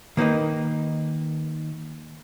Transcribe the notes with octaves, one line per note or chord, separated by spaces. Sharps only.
D#3 A#3 D#4 B4 D#5